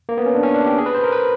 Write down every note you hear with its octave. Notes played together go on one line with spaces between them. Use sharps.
A#3
B3
C#4
D4
C#4
D4
G4
G#4
B4
C5
A#4
B4